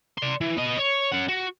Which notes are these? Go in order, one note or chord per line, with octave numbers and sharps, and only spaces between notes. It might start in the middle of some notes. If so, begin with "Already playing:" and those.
D5 C6
E3
B3 D#5
C#5
C#4 F#5
F#4